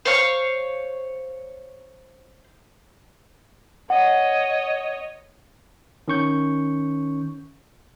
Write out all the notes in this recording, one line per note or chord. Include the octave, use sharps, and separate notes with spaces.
C5 C#5 F5 C#6
C#5 D#5 F#5
D#3 C#4 C#6 G6